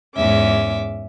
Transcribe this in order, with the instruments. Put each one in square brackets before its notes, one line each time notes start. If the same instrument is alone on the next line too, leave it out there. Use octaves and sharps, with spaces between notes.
[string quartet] E2 G#2 C#4 E5 D6